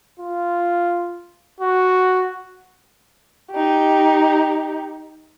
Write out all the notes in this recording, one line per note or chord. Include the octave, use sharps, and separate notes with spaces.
F4
F#4
D#4 G4